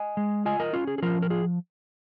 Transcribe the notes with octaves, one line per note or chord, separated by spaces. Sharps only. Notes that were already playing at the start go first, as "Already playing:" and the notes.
Already playing: D#5 G#5
G#3
F4 D#5 G#5
A#4 D#5
C#4 F4
G#4
G#4
F3 F4 A#4
A#4
F4 G#4